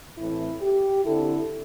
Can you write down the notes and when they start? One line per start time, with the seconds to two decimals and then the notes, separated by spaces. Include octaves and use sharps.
0.17 A2 E3 A3 C4 E4
0.61 G4
1.04 D3 C4 E4 A4